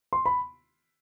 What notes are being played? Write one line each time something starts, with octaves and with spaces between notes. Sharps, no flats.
C6
B5